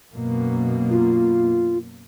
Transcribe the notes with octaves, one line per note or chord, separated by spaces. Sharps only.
F#2 B2 A#3
F4